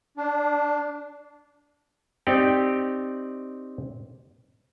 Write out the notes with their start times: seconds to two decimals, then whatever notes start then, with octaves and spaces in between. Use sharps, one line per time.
0.17 D4
2.27 C4 D#4 G4 D5 G5